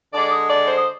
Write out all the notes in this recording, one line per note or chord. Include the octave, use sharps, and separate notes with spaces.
D3 G#3 D5
D#5
D5
C5
D#5